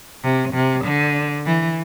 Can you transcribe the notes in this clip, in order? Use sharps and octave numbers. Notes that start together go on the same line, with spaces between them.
C3
C3
D3
E3